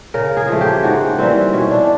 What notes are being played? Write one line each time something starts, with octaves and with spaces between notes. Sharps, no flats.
C#3 A#4
G#4
F3 A3
G4
G#2 F#4
E3 G3 A#3 C4
B2 C#4
D4